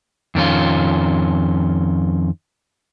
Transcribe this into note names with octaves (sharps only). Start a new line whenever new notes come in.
F2 D#3 C#4 F4